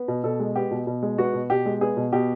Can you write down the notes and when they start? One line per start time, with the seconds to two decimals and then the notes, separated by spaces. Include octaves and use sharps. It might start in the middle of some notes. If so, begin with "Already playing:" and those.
Already playing: B3
0.08 B2
0.24 B2 A4
0.40 G#3
0.55 B3 G4
0.71 B2
0.87 B2
1.03 G#3
1.18 B3 F#4
1.34 B2
1.50 B2 G4
1.66 G#3
1.81 B3 G#4
1.97 B2
2.12 B2 G4